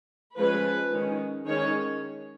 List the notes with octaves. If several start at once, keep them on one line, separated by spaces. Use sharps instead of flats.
F3 G#3 C#4 B4
D#3 G#3 C#4
D#3 G#3 C#4 C#5